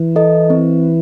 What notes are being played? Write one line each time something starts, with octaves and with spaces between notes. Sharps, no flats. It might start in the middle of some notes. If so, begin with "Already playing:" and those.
Already playing: E3
E4 A4 D#5
C4